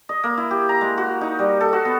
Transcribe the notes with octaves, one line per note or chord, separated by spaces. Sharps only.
D#5
A#3
E4
G4
A#5
G#3
F#4
D#4
G3
A4
F#4
B3